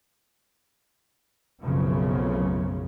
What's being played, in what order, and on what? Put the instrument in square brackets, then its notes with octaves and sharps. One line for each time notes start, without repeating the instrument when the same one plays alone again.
[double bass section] F1 B1 F#2 C#3 F3